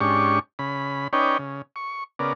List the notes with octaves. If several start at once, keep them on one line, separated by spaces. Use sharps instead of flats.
G#2 C#4 D4 G4 C#6
C#3 B5
C#4 D#4 B4 C#5 D5 G5
C#3
C#6
C#3 B3 A#4 D5